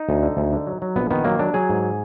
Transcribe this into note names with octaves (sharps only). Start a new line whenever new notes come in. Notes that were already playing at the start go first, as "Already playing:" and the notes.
Already playing: D#4
D2
D3
D2
D3
F#3
F#3
A#1 B3
D#3 B3
F#3 A#3
F#3 D4
F#3 G#4
G#2